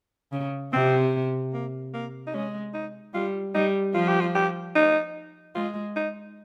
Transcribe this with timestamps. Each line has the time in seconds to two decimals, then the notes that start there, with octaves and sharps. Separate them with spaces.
0.32 C#3
0.73 C3 C4
1.54 A#3
1.94 A#3
2.27 D#4
2.33 G#3 C#4
2.74 D#4
3.14 G3 F4
3.54 G3 D#4
3.95 F3 F4
4.08 G4
4.21 F4
4.35 G4
4.75 D#4
5.55 G#3 F4
5.96 D#4